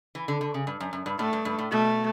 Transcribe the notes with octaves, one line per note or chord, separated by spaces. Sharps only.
E3
D3
D3
C#3
G2
F#2
F#2
G2
A2 A3
G2
G2
A2
B2 A3